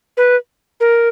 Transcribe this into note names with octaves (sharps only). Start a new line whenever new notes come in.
B4
A#4